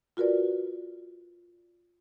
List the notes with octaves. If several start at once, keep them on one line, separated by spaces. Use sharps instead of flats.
F4 F#4 A#4 B4 D5